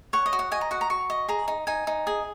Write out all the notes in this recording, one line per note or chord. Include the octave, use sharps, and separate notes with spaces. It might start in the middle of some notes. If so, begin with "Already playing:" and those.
C#5 F#5
D#5
F#4
F#5
D#5 G#5
A#5
F#4 F#5
A#5
F#4 C#6
D#5
G#4 A#5
D#4
D#4 G#5
D#4
G#4